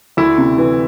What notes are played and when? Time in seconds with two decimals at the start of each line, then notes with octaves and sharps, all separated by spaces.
0.17 D2 E4
0.38 C3
0.58 E3